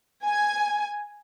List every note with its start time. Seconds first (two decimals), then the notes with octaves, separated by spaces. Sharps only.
0.24 G#5